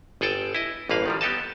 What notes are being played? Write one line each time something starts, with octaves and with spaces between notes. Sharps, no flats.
G1 G#4 A4 G5 A5
E4 D#5
A1 G2 A#3 B4 F5
D#3 F3 G3
B3 G4 A4 D#5 A5